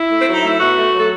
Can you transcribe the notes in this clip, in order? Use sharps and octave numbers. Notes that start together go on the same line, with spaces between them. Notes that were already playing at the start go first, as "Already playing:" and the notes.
Already playing: E4
A3
C4
F#3
D#4
A3 E4
B2 F#4
A3
F#3
A4